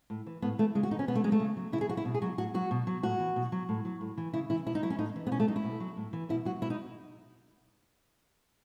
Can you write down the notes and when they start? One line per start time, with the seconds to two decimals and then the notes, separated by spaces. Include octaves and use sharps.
0.10 A2
0.26 E3
0.42 A2 B3
0.58 E3 A3
0.75 C#3 G#3
0.83 F#4
0.91 E3 D#4
0.99 C#4
1.08 B2 B3
1.15 A3
1.24 F#3 G#3
1.32 A3
1.40 C#3
1.57 F#3
1.72 C#3 E4
1.81 G#4
1.89 F#3 F#4
1.97 E4
2.05 B2
2.14 G#4
2.22 F#3 F#4
2.38 A2 F#4
2.54 F#3 F#4
2.71 B2
2.87 F#3
3.03 A2 F#4
3.20 E3
3.36 B2
3.52 F#3
3.69 A2
3.85 F#3
4.01 A2
4.18 E3
4.33 C#3 E4
4.50 E3 E4
4.66 B2 E4
4.75 D#4
4.83 F#3 E4
4.90 C#4
4.99 A2 D#4
5.16 E3
5.27 B3
5.31 B2 C#4
5.40 A3
5.48 F#3 D#4
5.56 E4
5.64 B2
5.80 F#3
5.97 A2
6.13 E3
6.29 B2 E4
6.45 F#3 F#4
6.62 B2 E4
6.70 D#4